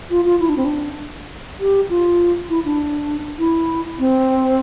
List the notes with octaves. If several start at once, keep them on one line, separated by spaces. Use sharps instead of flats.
F4
F4
E4
D4
C4
D4
G4
F4
E4
D4
E4
C4